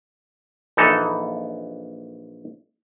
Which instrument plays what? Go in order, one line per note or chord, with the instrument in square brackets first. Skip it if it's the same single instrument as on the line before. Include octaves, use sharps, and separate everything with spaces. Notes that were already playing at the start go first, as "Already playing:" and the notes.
[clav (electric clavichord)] A#1 E3 D#4 A4